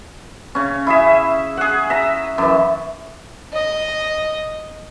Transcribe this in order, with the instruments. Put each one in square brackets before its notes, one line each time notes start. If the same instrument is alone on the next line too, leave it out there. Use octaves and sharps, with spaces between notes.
[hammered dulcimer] C#3 C#4
E4 G#4 E5
G#4 F#5
E5 A#5
F#2 E3
[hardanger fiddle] D#5